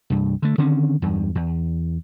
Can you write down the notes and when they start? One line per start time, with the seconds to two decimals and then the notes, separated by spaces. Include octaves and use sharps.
0.10 C2 G2
0.42 D3 A3
0.58 D3 D#3 C4 C#4
1.02 E2 G2
1.35 E2